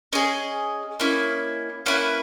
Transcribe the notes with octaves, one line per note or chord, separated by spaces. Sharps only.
C#4 G#4 D#5
A#3 C#4 E4
A#3 C#4 E4 B4